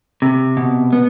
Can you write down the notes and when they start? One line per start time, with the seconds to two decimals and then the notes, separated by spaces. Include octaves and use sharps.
0.22 C3
0.57 B2
0.93 B3